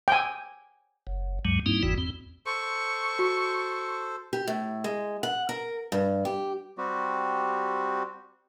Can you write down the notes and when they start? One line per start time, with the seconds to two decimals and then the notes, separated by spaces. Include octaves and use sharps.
0.08 G5 G#5
1.07 F#1
1.45 D2 G2 F#3 G#3
1.66 G#2 G3 A#3 C4 D#4 E4
1.83 G1 E2 G#2 E3 F#4
1.98 E2 C4
2.46 A4 C5 C#6
3.19 F#4
4.33 G4
4.47 A2
4.84 G#3
5.23 F#5
5.49 A#4
5.92 G2
6.25 G4
6.78 G3 C4 F#4 G4